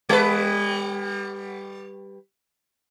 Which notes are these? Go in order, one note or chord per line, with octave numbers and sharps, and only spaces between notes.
G3 B4